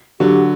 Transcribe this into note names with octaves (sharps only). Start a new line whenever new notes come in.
D3 F#3 G4